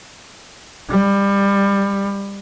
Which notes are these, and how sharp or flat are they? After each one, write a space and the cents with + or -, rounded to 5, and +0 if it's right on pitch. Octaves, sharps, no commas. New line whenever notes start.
G3 +20